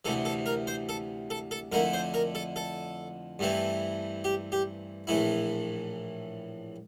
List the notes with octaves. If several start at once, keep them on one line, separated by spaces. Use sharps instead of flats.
D2 C3 E3 A4
A4
A#4
C5
A4
A4
A4
F2 D3 A3 E4 A#4
C5
A#4
A4
A4
G2 E3 A3 C4 E4
G4
G4
A#1 A2 E3 A3 E4